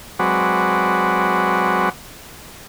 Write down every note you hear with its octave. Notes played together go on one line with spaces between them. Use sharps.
F#3 G#3 C4 F#4 B4 D5